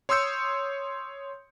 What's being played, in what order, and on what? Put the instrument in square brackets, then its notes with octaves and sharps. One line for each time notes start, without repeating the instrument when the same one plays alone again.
[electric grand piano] C#5 C6 D#6 E6 G6 C#7